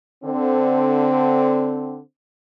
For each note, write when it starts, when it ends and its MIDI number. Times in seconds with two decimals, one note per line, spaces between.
0.24 1.99 50
0.24 1.99 60